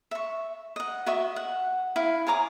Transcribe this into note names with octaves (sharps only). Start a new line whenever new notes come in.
E5 C#6
D#5 F#5
F#4 D#5 E5 C#6
F#5
E4 F5
G#4 C#5 A#5 D6